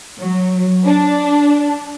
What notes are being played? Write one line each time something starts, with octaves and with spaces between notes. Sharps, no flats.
F#3
D4